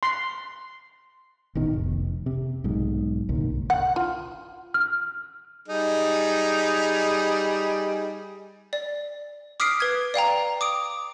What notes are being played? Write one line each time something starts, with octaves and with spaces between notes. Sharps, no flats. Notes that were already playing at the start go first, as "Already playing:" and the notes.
C6
A1 B2 D#3
F1
C3
B1 G#2
G1 C2 A#2 D#3
F#5
F4
F6
G3 D#4 G#4
D5
D6 D#6 F6 B6 C7 D7
B4 G#6
D5 F5 G5 A#5
D6 D#6 D7